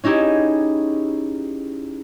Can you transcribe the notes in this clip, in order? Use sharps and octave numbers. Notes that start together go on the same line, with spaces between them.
C#4 D#4 E4 G4 G#4